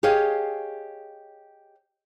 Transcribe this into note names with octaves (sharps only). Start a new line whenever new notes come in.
G4 G#4 C#5 D#5 F5